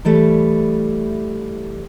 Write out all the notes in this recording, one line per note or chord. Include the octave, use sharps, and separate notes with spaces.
E3 G3 A3